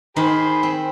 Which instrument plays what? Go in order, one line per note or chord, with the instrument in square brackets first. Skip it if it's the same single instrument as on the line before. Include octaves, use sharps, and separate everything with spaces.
[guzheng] D#3 [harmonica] G#4 C5 B5
[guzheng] C4